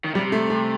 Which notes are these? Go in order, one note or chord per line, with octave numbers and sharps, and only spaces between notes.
D#3
C3 G3
A3
A3